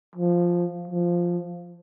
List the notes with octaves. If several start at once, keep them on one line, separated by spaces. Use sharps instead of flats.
F3
F3